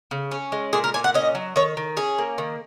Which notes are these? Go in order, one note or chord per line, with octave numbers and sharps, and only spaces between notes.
C#3
C#4
G#3
A#2 G#4
A#4
A#2 G#5
F#5
C#4 D#5
F#3
D#3 C#5
D#3
C#4 G#4
A#3
D#3